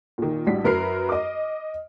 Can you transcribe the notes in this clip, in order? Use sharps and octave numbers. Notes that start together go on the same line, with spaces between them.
A#2 D#3
A1 G3 D4 F#4 B6
F#2 A#4 B4 F6 C7
D#5 D6